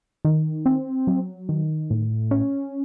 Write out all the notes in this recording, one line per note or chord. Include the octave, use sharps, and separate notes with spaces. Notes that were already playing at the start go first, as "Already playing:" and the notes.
D#3
C4
F#3
D#3
A2
C#4